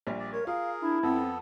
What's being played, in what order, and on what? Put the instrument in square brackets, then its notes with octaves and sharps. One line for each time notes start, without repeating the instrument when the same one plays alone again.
[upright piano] A#1 A#2 G3
[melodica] D5
[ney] A#4 [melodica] C#5
[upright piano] F4 [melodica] G#4 A#4 [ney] F5
[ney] D4 [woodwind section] E4
[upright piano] F2 [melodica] B3 A4 [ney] C4